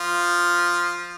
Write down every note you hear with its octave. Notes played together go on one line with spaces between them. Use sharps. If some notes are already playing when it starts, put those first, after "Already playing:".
Already playing: F3 F4